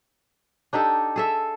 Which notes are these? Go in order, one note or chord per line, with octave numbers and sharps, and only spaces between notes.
D4 D#4 G4 A4
G#4 A4 E5